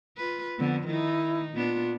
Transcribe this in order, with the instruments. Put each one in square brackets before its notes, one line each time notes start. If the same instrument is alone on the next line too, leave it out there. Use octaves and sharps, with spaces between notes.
[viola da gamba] F4 B4
[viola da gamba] F2 D3 [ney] B3
[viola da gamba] D#3 D#4 [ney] E4
[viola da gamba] A#2 B3 D4 [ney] F4